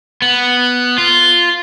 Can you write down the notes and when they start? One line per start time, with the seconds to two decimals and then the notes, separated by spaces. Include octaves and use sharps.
0.22 B3
0.98 F4